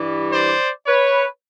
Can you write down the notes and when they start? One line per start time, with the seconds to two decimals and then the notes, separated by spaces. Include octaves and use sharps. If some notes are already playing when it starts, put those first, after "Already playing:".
Already playing: G2 E3 G3
0.33 C5 D5
0.87 B4 C#5